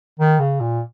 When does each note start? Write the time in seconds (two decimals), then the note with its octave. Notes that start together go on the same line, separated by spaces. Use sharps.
0.20 D#3
0.40 C#3
0.60 A#2